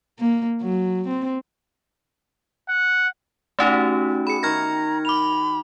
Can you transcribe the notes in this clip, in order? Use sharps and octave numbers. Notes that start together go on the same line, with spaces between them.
A#3
F#3
C4
F#5
A3 C#4 D#4 E4 F#4 G4
G#4 B5 C#7
D#3 A#5 F6 G#6 A#6
B5 D6 F7